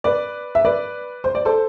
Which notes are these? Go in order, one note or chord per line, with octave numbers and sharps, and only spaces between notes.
B4 D5
E5
B4 D5
C5
D5
A4 C5